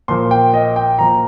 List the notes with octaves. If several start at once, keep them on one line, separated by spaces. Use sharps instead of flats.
A#2 F3 C6
G5
D#5
G5
A#2 F3 A#5